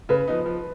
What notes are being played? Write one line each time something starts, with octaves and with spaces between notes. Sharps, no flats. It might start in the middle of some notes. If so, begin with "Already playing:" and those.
C#3 B4
F3 B3 D#4
F3